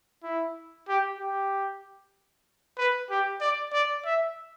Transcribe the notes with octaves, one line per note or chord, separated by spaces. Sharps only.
E4
G4
G4
B4
G4
D5
D5
E5